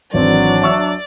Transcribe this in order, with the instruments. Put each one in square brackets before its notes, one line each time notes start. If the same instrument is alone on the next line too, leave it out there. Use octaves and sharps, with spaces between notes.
[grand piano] G#1 C4 [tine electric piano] E3 C#5 [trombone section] F#3 D4 [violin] D5
[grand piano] E5 C#6 E6